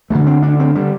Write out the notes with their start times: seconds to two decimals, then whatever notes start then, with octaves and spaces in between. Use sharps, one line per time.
0.10 D2 D3 A3
0.27 C4
0.43 D4
0.60 C4
0.75 D3 G3